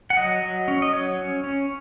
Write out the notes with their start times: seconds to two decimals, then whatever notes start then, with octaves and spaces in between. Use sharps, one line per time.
0.10 F#5
0.17 F#3 D#5
0.42 F#3
0.68 C#4
0.82 D#5
0.93 F#3 C#5
1.19 C#4
1.44 C#4